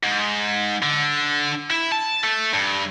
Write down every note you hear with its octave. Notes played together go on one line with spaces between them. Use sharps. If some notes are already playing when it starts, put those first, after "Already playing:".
G#2
D3
E4
A5
A3
G2